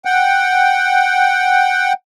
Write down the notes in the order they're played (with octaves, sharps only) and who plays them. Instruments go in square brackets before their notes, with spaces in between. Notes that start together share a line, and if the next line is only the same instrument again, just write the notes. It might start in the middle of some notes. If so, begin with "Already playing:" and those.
[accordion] F#5 G5